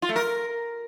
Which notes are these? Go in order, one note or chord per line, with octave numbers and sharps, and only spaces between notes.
F4
A3
A#4